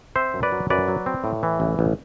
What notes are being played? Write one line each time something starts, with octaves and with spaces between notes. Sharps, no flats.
C4 C5 E5
F#2
B4 D5
F#3
F#2 B4 D5
F#3
C4
A2
E3
A1
A1